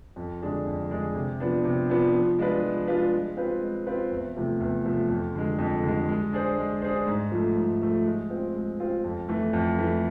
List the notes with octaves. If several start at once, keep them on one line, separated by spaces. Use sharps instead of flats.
F2
D3 G#3 D4 G#4
F2
D3 G#3 D4 G#4
C3
F3 B3 D4
C3
F3 B3 D4
F3
G#3 D4 F4 B4
F3
G#3 D4 F4 B4
G#3
C4 F4 B4
G#3
C4 F4 B4
E2
C3 F3 A3
E2
C3 F3 A3
F2
D3 G#3
F2
D3 G#3
G#3
D4 G#4 C5
G#3
D4 G#4 C5
G#2
F3 A3
G#2
F3 A3
G#3
C4 F4
G#3
C4 F4
F2
E3 A3
F2
E3 A3